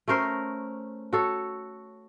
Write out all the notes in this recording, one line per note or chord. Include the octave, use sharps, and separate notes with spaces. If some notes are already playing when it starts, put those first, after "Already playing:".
A3 C#4 A#4 C5
F#4 A4 C#5